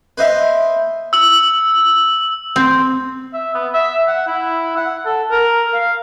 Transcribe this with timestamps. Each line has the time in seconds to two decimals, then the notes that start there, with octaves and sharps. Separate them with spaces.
0.18 B4 C5 D#5 E5
1.13 E6 F#7
2.56 C4
3.34 E5
3.55 B3
3.74 E5
4.08 F#5
4.27 E4
4.77 F#5
5.06 A4
5.31 A#4
5.73 F5